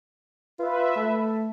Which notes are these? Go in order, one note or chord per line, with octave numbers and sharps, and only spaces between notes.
F4 B4 E5
A3